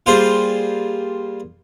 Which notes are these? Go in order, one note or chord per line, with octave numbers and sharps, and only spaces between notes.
G3 A#3 F4 G#4 C5